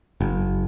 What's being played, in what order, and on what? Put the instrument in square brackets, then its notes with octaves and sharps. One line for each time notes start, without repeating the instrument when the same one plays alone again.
[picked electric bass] F#1